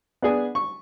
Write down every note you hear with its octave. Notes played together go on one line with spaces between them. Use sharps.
B3 D4 G#4 G#5
C#6